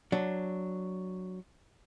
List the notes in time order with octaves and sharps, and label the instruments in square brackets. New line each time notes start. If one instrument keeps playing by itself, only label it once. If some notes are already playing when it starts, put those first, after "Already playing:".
[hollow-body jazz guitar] F#3 D4